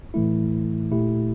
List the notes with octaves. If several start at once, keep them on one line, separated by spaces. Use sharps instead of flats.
A2 E3 A3 E4
A#2 A3 E4 G4